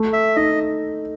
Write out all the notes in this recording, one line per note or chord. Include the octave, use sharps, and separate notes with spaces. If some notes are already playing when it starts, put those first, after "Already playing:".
Already playing: A3
E5
D#4 D#5